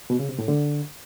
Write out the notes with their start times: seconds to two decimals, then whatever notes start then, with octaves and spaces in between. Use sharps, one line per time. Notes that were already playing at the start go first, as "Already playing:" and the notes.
0.10 B2
0.19 C#3
0.29 C3
0.39 A2
0.48 D3